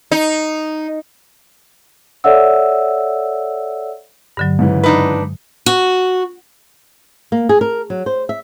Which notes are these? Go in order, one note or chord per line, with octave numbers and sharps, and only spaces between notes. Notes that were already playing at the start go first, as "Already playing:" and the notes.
D#4
A4 C#5 D5 E5 F#5 E6
G2 D3 F#3
G#2 C#3 E3
D4 D#4 B4
F#4
A#3
G#4
A#4
F#3
C5
E5